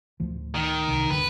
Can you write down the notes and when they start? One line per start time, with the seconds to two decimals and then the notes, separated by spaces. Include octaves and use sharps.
0.20 D2 A2 F3
0.55 D#3
0.88 C2
1.10 G1 D2 D3 B4